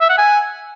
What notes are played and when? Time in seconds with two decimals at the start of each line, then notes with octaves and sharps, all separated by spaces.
0.01 E5
0.10 F#5
0.18 G#5